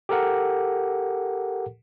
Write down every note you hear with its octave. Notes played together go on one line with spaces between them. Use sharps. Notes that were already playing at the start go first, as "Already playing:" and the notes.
G4 A4 A#4 F#5